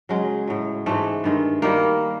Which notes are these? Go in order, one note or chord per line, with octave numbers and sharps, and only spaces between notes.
C#3 F#3 G#3
A2 F#3
G#2 E3 G#3 A3
G2 D#3 G#3
D#3 G3 A#3